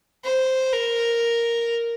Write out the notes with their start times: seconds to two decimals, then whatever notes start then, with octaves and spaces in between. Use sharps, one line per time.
0.24 C5
0.73 A#4